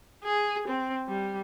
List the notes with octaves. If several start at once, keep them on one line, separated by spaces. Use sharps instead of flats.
G#4
C4
G3